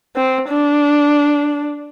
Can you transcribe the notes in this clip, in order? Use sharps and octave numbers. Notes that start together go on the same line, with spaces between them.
C4
D4